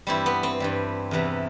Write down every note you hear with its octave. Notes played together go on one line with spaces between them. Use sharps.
G2 E3 G3 C4 E4
B3
C4
G2 E3 G3
E2 C3 E3 G3